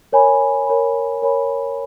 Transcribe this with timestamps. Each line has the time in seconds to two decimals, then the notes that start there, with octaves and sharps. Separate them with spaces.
0.12 A#4 C#5 G#5 B5
0.67 A#4 C#5 G#5 B5
1.22 A#4 C#5 G#5 B5